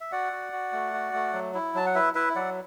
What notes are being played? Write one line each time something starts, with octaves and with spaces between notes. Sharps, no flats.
E5
F#4 D5 F#5
F#4
F#4
A3
F#4
A3
F#3
E4
F#3 A5
F#5
E4 B4 E5
E4 B4 E5
F#3 D5 F#5